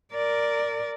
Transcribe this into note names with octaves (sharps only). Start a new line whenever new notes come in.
A#4 D5